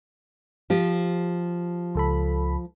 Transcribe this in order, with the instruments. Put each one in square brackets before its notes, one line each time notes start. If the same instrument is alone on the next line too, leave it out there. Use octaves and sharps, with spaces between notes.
[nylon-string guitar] F3 G4
[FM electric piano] C#2 A4 B5